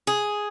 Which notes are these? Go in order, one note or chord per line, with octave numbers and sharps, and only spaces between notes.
G#4